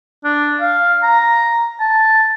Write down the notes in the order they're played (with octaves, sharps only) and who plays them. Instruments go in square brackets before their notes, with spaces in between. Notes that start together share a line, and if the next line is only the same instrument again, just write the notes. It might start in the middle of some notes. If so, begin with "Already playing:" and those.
[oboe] D4
F5
A#5
A5